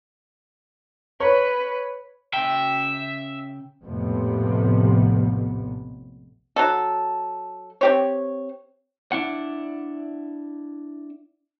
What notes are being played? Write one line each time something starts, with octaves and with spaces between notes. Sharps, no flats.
B4 C#5
C#3 E5 G5
A#1 F2 A2 C3 B3
F#3 A4
C4 G4 C#5
D4 E4 F#5